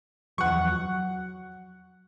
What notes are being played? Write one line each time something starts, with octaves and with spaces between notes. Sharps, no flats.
E2 F3 F#3 F#5 C#6
F#3